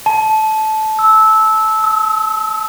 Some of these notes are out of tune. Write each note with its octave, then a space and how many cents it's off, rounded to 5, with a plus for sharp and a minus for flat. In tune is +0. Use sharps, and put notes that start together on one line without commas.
A5 -15
E6 -15
D#6 +45